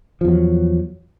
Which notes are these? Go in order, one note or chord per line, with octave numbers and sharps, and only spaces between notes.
E2 F3 F#3